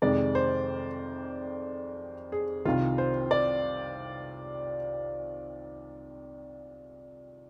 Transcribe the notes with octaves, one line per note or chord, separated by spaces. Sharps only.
F2 C3 D#3 G#3 D5
C5
G#4
C2 C3 D#3 F4
C5
D5